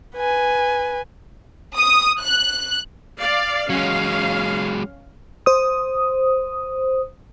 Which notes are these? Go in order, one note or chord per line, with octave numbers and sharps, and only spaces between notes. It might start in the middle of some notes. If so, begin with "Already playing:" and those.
B4 G#5
D#6
F#6
D5 F5
F#3 G#3 C#4 F5
C5 D#6